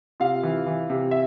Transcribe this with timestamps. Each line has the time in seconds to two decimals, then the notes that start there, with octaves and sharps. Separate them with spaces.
0.20 C3 F4 F5
0.43 E3
0.66 E3
0.90 C3
1.11 E5